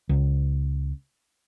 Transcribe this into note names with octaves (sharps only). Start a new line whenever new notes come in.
C#2